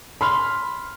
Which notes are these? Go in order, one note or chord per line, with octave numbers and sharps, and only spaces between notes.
B5 C6 F6